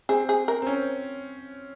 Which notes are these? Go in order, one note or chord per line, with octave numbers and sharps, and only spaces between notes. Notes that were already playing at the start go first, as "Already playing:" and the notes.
C4 G#4
G#4
A#4
C4
C#4